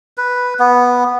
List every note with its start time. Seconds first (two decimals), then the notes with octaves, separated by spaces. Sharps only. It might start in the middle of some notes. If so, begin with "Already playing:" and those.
0.17 B4
0.59 B3